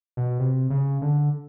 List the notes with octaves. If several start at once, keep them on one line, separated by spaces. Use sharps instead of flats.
B2
C3
C#3
D3